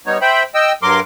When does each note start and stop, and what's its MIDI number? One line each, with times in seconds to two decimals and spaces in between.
0.06 0.18 55
0.06 0.18 59
0.06 0.18 63
0.06 0.18 73
0.21 0.43 72
0.21 0.43 76
0.21 0.43 79
0.21 0.43 83
0.55 0.72 75
0.55 0.72 79
0.55 0.72 88
0.82 1.00 43
0.82 1.00 54
0.82 1.00 70
0.82 1.00 84
0.82 1.00 86